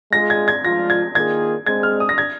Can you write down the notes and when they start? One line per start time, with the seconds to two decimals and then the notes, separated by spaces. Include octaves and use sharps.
0.13 G#3 F4 G#4 A#6
0.30 G#6
0.48 G#6
0.64 F3 G#3 F4 A#6
0.90 G#6
1.15 D#3 A#3 F4 G#4 G#6
1.66 G#3 C4 G#4 G#6
1.83 F6
2.00 D#6
2.09 A#6
2.18 G#6